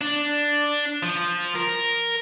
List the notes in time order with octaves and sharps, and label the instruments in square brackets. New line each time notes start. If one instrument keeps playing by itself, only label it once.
[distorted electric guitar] D4
F3
A#4